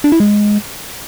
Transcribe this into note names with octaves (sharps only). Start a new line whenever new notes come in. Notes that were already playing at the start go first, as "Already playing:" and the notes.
D4
E4
G#3